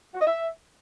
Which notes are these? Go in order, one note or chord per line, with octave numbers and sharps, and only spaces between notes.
F#4
D#5
E5